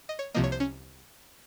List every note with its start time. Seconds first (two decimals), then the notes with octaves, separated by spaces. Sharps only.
0.09 D#5
0.19 C#5
0.34 C2 C3 F3 A#3 D#5
0.44 C#5
0.52 C5
0.60 C#4